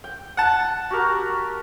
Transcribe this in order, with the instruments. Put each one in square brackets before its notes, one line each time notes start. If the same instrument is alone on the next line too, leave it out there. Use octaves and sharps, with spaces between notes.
[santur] G5
[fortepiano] F#5 A5
[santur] F#4 G4 A#4